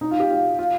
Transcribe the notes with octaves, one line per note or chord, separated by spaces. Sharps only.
D#4
F4
G4
F4
F4